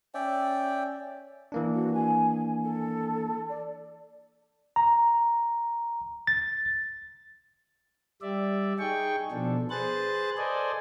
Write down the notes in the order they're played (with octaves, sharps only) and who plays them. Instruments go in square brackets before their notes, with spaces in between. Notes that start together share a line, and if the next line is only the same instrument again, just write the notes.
[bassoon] C#4 [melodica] D5 E5 G5
[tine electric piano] E3 A#3 D4
[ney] F#4
G#5
A4
D5
[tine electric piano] A#5
A6
[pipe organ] G3 D5 E5
D#4 G#4 G5 C#6
B2 F3 D4 A4
G#4 B4 C5 F#6 A6
A4 C5 D5 D#5 G#5